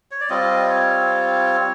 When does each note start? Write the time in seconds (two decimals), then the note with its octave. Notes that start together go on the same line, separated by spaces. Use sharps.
0.11 C#5
0.21 D5
0.30 G3 C4 F4 D#5
0.70 C#5